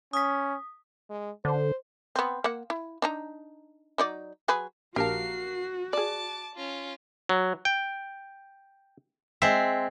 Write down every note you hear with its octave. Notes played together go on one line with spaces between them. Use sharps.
C#4 D#6 B6
G#3
D3 C5
B3 C4
A#3 F#5
E4
D4 D#4 A#5
F#3 D#4 D5
F#3 G#4 B4
A#1 F#4 G4 A#4 F5 A5 C7
G#4 D5 A5 D6
C#4 F4
F#3
G5
G#3 C4 E5